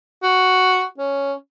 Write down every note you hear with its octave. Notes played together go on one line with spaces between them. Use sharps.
F#4
C#4